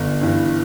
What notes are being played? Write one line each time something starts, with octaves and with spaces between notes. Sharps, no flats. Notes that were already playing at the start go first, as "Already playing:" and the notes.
Already playing: G1
G2 E3